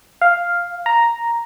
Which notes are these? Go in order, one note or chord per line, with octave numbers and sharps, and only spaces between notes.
F5
A#5